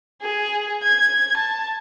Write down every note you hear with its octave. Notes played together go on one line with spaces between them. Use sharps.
G#4
G#6
A5